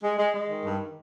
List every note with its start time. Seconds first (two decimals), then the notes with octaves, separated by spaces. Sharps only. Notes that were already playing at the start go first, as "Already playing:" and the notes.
0.03 G#3
0.17 G#3
0.33 G#3
0.49 D#3
0.64 G2